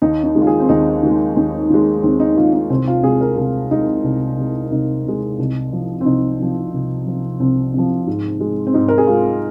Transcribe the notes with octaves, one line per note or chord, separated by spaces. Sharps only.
D#2 D#4
D#4
D#3 G#3
F4
G#4
C4
D#2 D#4
D#3 G#3
D#2
D#3 G#3
D#2 C4
D#4
D#3 G#3 F4
D#4
C2 C4
F4
C3 G#3 G#4
A#4
C2 G#4
C3 G#3 D#4
C2
C3 G#3
C2 D#4
C3 G#3
C2
C3 F3
C4
C2 D#4
C3 F3
C2
C3 F3
C2 C4
C3 F3
G#2
G#3
C4
G#2 D#4
A#4
G#4
G#3 F4